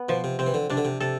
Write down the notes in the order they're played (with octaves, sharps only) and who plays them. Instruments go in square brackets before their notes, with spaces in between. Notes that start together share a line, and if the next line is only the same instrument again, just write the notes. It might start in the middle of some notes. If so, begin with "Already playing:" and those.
Already playing: [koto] B3
[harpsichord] B2 [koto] F3
[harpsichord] C3
[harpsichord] C3 [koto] C4
[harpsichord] E3
D3
[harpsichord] C3 [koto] D4
[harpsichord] D3
C3
[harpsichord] C3 [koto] A4